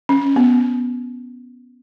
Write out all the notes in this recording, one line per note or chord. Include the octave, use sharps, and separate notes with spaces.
C#4
B3